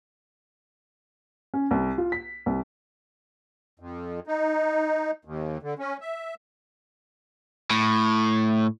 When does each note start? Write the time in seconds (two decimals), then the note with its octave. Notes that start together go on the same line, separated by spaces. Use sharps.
1.54 C#4
1.71 C2
1.98 F4
2.12 B6
2.46 C2
3.80 F2
4.27 D#4
5.25 D#2
5.63 D3
5.79 C#4
6.01 E5
7.70 A2